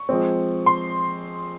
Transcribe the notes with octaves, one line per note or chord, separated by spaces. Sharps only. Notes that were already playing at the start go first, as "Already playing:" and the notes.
Already playing: C#6
F3 G#3 C4
C6